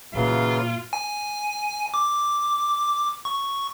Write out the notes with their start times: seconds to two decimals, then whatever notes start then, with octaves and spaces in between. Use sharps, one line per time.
0.15 A#2 C#3 E3 F#3 F4
0.93 G#5
1.94 D6
3.25 C#6